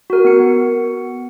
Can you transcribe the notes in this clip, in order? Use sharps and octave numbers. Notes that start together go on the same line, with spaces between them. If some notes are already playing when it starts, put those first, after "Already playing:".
F#4 A#4
B3 C#7